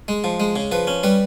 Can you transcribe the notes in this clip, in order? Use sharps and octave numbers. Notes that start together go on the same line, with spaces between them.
G#3
F3
G#3
C#3
F3 B4
C#4
G3 B4